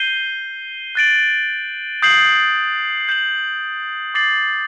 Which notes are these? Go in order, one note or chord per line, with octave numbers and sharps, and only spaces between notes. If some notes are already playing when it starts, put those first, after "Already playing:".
Already playing: G6 C7 D#7 G7
F#6 A6 D7 F#7
D#6 G6 C7 F#7
G6 C7 F#7
D6 A6 C7 F#7